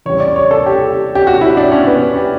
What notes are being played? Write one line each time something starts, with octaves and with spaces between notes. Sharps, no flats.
E2 C#3 G3 C#5
D5
C#5
A4
G4
G4
F#4
E4
D4
C#4
B3
C#4
G4